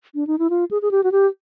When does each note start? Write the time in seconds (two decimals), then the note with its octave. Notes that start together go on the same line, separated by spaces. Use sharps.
0.15 D4
0.27 D#4
0.39 E4
0.50 F4
0.71 G#4
0.82 G#4
0.91 G4
1.04 F#4
1.12 G4